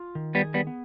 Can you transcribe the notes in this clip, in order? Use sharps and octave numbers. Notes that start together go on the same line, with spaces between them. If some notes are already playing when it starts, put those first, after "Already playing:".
Already playing: F4
D#3
G3 B3
G#4
G3 B3
B3